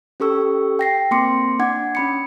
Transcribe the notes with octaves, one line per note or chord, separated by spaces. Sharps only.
C#4 G4 A4 C#6 E6
G5 A#6 C7
A#3 C4 C6 D6 C#7
D4 F#5 D6 G#6
C#4 B5 C#7